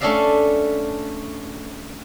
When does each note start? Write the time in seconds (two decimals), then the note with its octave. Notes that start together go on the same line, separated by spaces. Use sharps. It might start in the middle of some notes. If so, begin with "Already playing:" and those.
0.01 A3 C#4 D4 D5 E5 F5